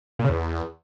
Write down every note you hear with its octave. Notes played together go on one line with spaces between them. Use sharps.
A#2
C#3
E2